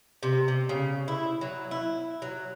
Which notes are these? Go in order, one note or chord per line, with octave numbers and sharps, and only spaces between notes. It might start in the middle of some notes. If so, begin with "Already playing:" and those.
C3
C3
C#3
E4
F#3
E4
F#3